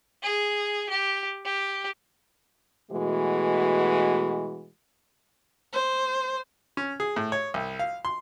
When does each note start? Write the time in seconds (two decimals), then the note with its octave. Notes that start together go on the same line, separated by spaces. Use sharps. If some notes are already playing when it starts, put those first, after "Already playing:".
0.23 G#4
0.90 G4
1.46 G4
2.91 B2 E3 G#3 A3 F#4
5.73 C5
6.77 C#4
7.00 G#4
7.16 A2
7.32 C#5
7.54 C2
7.79 F5
8.05 C6